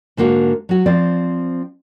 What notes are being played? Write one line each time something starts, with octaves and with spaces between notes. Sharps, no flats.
G#2 D3 A#3 F#4
F#3 F#4
F3 C4 D5